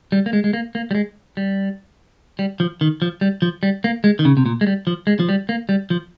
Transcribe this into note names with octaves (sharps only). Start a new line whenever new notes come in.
G3
A#3
G#3
G#3
A#3
A#3
G3
G#3
G3
G3
F3
D#3
F3
G3
F3
G3
A#3
G#3
D#3
C#3
C3
A#2
G#3
G3
F3
G#3
F3
G3
A#3
G3
F3